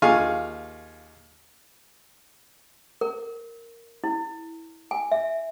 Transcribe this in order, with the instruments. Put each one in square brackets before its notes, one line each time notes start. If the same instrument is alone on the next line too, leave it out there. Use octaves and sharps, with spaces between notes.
[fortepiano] D#2 F4 G#4 F5 G#5 C#6
[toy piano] A#4
E4
G#5
E5